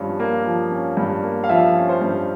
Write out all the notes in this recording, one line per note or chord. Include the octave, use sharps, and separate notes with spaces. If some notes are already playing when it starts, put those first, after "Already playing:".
Already playing: G2 F3 C#4
A#3
F3
C#4
G2
A#3
F5
F3 E5
C#4
C5
G2